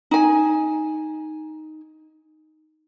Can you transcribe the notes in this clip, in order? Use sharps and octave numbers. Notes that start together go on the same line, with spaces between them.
D#4 G#5